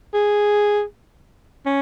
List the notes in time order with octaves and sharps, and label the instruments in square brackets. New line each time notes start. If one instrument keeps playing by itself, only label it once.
[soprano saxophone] G#4
C#4